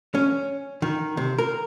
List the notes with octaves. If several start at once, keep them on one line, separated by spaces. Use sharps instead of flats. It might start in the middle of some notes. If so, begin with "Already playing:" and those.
C#4
D#3
C3
A#4